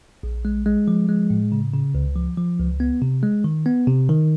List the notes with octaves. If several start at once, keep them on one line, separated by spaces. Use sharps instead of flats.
A#1
G#3
G#3
F3
G#3
A2
C#3
C#3
C#2
F3
F3
C#2
B3
C3
G#3
D#3
B3
C3
D#3